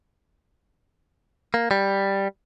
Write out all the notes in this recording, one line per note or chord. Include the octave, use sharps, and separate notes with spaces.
A#3
G3